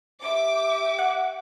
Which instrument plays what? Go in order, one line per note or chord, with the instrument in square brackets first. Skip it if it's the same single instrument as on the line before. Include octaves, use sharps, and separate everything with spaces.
[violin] G4 E5 [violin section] D6
[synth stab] F#5